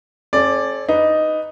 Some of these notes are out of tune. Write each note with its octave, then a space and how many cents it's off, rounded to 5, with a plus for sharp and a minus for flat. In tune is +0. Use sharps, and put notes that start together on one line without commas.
C#4 -40 A4 -35 D5 +0
D#4 +0 B4 +0